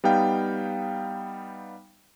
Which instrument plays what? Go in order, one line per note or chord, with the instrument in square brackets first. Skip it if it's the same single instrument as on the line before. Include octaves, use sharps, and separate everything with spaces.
[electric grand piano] G3 B3 D#4 F5 G5